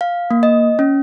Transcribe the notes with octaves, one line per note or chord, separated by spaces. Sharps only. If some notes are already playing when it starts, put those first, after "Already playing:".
F5
A#3
D#5
C#4